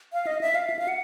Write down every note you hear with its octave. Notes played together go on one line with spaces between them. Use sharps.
F5
D#5
E5
F5
E5
F5
F#5